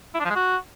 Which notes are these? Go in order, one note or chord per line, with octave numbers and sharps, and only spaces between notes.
E4
D4
F3
G#3
F#4